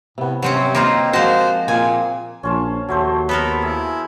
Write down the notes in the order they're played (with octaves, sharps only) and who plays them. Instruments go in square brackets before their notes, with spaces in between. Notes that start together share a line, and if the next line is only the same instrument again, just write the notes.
[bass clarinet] A2 [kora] C3 B3
[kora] G2 [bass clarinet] C3 [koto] F#3 C4 C#4
[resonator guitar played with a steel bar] A#3 [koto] C4 D#4 F4
[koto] F3 A5 [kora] G#3 A#3 [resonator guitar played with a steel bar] F#4 [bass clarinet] C5
[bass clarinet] A#2 [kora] A#3 C4 G#4 [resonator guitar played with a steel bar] G#5
[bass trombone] A#1 [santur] C#4 F4 A5
[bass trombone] D#2 [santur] F#3 A3 C5
[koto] B3 A4 A#4 [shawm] B5
[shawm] E4 [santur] G#4 F5